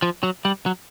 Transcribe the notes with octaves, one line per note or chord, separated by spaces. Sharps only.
F3
F#3
G3
F#3